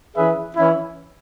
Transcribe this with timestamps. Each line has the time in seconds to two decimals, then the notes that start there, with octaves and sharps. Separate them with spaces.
0.16 E3 C#4 G#4 B4 E5
0.57 E3 C#4 E4